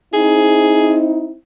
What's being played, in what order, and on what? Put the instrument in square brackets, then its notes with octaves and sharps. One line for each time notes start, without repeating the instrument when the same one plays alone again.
[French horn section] C4 D#4 E4 [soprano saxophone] G#4